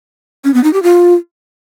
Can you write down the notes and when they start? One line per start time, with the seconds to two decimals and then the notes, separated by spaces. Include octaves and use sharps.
0.44 C#4
0.54 B3
0.64 D#4
0.73 G4
0.83 F4